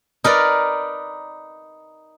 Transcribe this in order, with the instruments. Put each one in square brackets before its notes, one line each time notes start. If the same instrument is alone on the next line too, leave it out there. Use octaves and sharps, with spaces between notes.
[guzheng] D#4 A#4 B4 D5